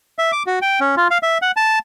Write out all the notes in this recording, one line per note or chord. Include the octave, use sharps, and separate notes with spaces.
E5
D6
F#4
G5
C#4
F4
F5
E5
F#5
A5